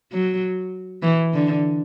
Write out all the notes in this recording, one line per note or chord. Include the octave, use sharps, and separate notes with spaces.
F#3
E3
D3